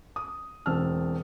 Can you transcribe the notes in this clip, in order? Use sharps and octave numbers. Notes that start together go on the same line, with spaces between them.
D#6
E1 C4 A5 E6 F6